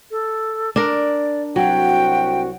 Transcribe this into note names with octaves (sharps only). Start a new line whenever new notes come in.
A4
D4 A#4 D5
C2 F#3 C4 F#4 G5